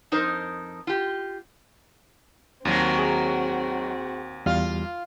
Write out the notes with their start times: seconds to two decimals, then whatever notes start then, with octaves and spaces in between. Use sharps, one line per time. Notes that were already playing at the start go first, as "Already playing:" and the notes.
0.12 F2 D#4 A#4 C5
0.87 F4 G4
2.65 D#2 D#3 F#3 C4 F#4
2.99 G#4
4.46 E2 G3 F4 F5